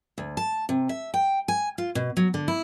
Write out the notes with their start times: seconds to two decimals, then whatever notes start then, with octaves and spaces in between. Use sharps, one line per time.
0.18 D2
0.37 A5
0.69 C3
0.89 E5
1.14 G5
1.48 G#5
1.78 F4
1.95 B2
2.17 F#3
2.34 D3
2.48 E4